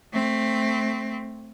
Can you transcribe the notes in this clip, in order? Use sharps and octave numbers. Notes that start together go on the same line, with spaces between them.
A3 C4